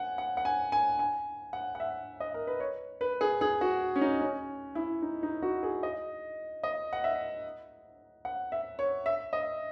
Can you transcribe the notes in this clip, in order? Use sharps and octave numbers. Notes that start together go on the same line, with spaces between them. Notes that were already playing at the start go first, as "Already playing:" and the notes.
Already playing: F#5 G#5
F#5
F#5
G#5
G#5
G#5
F#5
F#5
E5
D#5
A#4
B4
C#5
B4
G#4
G#4
F#4
C#4
D#4
C#4
E4
D#4
D#4
F#4
G#4
D#5
D#5
F#5
E5
F#5
E5
C#5
E5
D#5